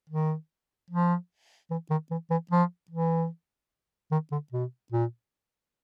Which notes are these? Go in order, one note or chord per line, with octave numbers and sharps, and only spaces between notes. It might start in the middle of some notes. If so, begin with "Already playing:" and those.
D#3
F3
E3
D#3
E3
E3
F3
E3
D#3
D3
B2
A#2